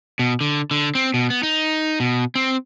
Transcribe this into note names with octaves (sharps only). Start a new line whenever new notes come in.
B2
D3
D3
C4
B2
B3
D#4
B2
C4